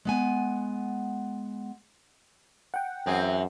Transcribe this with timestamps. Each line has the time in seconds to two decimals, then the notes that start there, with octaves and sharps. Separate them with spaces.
0.05 G#3 B3 G#5
2.74 F#5 G5
3.06 F#2 E3 C4 G#4